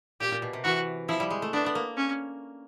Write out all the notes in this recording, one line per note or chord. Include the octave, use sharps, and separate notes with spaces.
A#2 G4
A#2
B2
C3
E3 F#4
F3 E4
G3
G#3
A3
B3 D4
B3
A#3
C#4